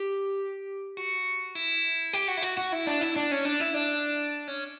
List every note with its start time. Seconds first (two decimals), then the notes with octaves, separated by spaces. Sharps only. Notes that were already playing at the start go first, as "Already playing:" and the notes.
Already playing: G4
0.97 F#4
1.55 E4
2.13 G4
2.28 F#4
2.37 E4
2.43 F#4
2.57 F#4
2.72 E4
2.87 D4
3.01 E4
3.16 D4
3.31 C#4
3.45 D4
3.60 E4
3.74 D4
4.48 C#4